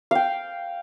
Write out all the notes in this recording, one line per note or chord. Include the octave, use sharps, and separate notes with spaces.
F5 G5